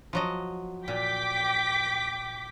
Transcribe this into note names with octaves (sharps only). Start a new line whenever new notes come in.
F3 F#3 D#5
A#2 G5 D6 B6